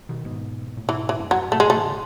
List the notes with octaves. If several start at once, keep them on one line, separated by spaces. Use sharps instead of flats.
B2 D#3
G#2 B2
A2
G#2 B2 E3
E3
F#2 A2
F#3
G#2 B2 A3
G#3
G#2 B2 A3
D#3
A2 C#3